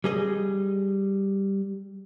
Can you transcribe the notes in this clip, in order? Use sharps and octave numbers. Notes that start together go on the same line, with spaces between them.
G3 G#4 D#5